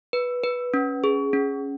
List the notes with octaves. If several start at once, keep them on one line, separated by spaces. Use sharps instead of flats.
B4
B4
C#4
G#4
C#4